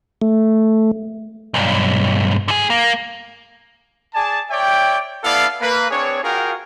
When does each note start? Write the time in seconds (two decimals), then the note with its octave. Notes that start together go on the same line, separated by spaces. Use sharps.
0.22 A3
1.54 B1 G2
2.48 D3 G#4
2.70 A#3
4.14 G#4 D5 G#5 A5
4.51 C#5 D5 E5 G5
5.24 B3 E4 A4 D5 F5
5.61 A#3 B4
5.90 C4 D4 G#4 C#5
6.23 F4 F#4 G#4 A#4 F5 G5